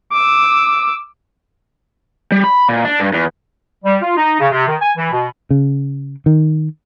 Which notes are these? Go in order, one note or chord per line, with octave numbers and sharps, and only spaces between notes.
D6 E6
G3
B5
A#2
D4
G2
E2
G3
F4
D#4
C#3
C3
D#3
G#5
E3
B2
C#3
D#3